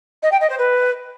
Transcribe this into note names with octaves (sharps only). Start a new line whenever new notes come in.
D#5
G5
D#5
C5
B4